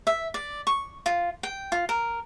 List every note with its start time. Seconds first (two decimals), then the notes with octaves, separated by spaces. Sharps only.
0.07 E5
0.34 D5
0.67 C#6
1.06 F4
1.43 G5
1.72 F4
1.89 A#4